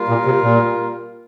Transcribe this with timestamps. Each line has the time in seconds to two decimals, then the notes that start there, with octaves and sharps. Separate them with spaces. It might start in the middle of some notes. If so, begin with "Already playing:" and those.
Already playing: G3 A#3 F4 A#4
0.08 A#2
0.25 C3
0.42 A#2